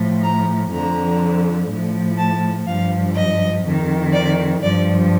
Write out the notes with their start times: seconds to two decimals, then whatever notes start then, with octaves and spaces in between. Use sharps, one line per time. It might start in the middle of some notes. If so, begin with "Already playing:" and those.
Already playing: A2 F3
0.23 A#5
0.71 F2 D3 F3 A#5
1.69 A2 F3
2.18 A5
2.66 G2 F3 F5
3.15 D#5
3.64 F2 D#3
4.13 D5
4.61 G2 F3 D5